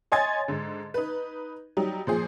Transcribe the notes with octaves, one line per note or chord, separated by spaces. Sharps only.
C#5 D#5 G#5 C6 G#6 A6
G#2 D3
D#4 B4
F#3 G3 D#4
A#2 F3 G#4